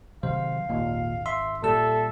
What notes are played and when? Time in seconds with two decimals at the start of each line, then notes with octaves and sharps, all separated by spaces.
0.23 C3 D#3 F#3 C5 F5
0.69 G#1 D#2 A#2
1.26 E5 C6
1.63 A#2 G3 A4 E5 E6